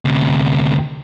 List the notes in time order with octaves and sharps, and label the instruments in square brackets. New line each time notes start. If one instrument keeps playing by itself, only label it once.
[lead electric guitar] D2 C3